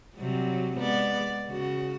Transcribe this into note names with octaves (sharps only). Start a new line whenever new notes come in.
C3 F#3 G3
G#3 B3 D5
C#3 F#4